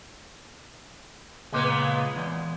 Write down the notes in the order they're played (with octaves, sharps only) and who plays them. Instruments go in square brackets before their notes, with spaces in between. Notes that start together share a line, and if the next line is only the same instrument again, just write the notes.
[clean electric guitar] C#2 A#2 [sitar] G#3 A#3 B3
[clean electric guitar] E2